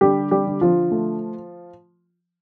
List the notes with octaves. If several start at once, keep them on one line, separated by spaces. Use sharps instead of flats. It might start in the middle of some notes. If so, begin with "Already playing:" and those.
D3 G3 G4
G3 G4
D3
F3 F4
A3